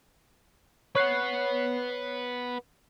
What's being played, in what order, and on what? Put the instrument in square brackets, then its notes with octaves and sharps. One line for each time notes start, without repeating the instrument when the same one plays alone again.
[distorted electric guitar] B4 F#5 [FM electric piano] C#5 F#6 C7